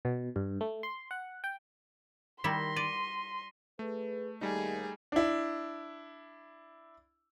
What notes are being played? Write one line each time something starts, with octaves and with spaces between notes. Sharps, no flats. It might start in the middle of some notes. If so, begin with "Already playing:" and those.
B2
G2
A3
C6
F#5
G5
D#3 G3 E4 C6 A#6 B6
D5 D#7
A3 G#4 B4
D#2 G3 A3 D#4 G#4
D4 E4